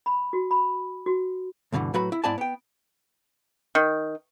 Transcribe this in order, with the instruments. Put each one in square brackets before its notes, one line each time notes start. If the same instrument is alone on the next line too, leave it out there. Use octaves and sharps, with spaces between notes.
[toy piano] B5
F#4
B5
F#4
[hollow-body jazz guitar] D2 G2 B2 D3 E3
A2 F#3 F#4 B4 B5
E4
G#2 B3 E4 D5 G#5 A5
B3 G5
[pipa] D#3